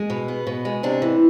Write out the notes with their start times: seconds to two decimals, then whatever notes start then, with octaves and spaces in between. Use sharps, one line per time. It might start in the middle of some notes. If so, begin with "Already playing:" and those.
Already playing: G#3
0.10 B2
0.28 B3
0.47 B2
0.65 G#3
0.83 C3 D4
1.02 E3